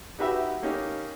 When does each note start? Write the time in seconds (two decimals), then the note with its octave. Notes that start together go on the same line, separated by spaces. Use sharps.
0.18 D#4 F#4 G4 B4 E5
0.62 A#3 C#4 D#4 G4